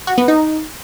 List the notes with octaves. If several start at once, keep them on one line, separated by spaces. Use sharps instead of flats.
F#4
B3
D#4